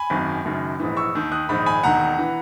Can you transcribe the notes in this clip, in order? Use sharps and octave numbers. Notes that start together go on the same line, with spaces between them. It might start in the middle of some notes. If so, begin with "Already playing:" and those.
Already playing: G#5 B5
G#1 F#2 D#3
F#1 F#2 D#3
A#1 G#2 E3
C#6 E6
D#2 D#3
D#6 F#6
A#1 G#2 D#3 B5 D#6
G#5 B5
E1 D#2 D#3 F#5 A#5
E3